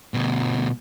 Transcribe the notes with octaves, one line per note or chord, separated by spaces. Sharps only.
D2 B2